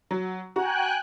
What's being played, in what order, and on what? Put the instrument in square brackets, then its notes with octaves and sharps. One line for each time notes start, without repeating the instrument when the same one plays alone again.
[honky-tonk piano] F#3
[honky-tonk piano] F#4 A#5 [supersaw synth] G5 G#5 F#6